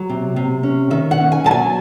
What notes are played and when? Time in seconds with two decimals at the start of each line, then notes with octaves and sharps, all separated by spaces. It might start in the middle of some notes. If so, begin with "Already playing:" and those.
Already playing: F#3
0.09 C3
0.36 C3
0.63 C#4
0.90 D#3 E5
1.11 F#5
1.18 C#4
1.32 G#5
1.44 F#3 A5
1.51 G#5